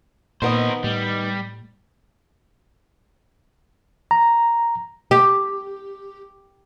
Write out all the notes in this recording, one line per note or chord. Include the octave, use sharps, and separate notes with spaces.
A#2 D#3 B3 A#4 C5 D#5
A2 G3
A#5
G4